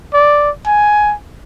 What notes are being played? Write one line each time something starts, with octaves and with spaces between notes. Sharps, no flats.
D5
G#5